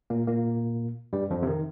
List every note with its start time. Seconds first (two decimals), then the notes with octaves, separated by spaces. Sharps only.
0.10 A#2 A#3
0.27 A#2 A#3
1.13 G2 G3
1.30 F2 F3
1.43 C3
1.47 D#3